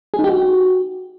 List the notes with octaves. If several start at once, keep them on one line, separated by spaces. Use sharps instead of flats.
G#4
D#4
G4
F#4